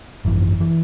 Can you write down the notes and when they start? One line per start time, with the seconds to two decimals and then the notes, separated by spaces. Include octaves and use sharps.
0.25 G#1 F#2 E3
0.60 E3